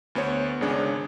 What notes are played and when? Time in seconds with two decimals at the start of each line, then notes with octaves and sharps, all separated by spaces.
0.15 D2 B3 C5 C#5
0.61 G#1 C#3 G#3 D4 G#4 C#5